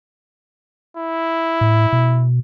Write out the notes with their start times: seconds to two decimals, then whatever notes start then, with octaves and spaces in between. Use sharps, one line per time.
0.97 E4
1.61 A2
1.93 B2